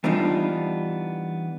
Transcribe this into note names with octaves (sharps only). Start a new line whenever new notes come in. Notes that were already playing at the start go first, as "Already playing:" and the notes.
E3 G3 B3 D4 D#4 F4